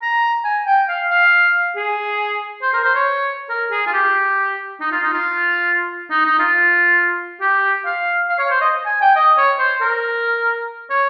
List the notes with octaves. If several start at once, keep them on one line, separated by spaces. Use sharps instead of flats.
A#5
G#5
G5
F5
F5
G#4
C5
A#4
C5
C#5
A#4
G#4
F4
G4
D#4
F4
D#4
F4
D#4
D#4
F4
G4
F5
F5
C#5
C5
D#5
G#5
G5
D#5
C#5
C5
A#4
C#5